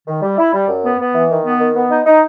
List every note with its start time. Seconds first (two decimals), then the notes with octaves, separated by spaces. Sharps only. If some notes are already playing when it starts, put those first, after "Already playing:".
0.08 D#3
0.22 G3
0.38 E4
0.53 G3
0.68 F#2
0.84 B3
0.99 B3
1.14 E3
1.30 D#3
1.45 B3
1.60 D#3
1.75 B3
1.90 D#4
2.06 D#4